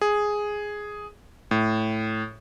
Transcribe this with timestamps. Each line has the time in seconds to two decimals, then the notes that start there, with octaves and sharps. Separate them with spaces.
0.01 G#4
1.51 A2